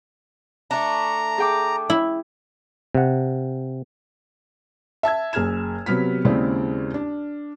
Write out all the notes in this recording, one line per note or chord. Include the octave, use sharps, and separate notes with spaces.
A3 D4 A#5
G#4 G5 D6
E4
C3 F#5
E5 A5 E6 G#6
F#1 G#4 F6 G#6 E7
C3 F#3 B3 F6 B6
D#2 C#3 G#3 C4 E4 D5
D4